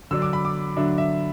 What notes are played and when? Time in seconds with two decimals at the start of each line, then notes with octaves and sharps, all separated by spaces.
0.11 D3 F#3 D4 E6
0.22 D6
0.33 B5
0.45 D6
0.77 D3 F#3 D4 E5
0.98 E5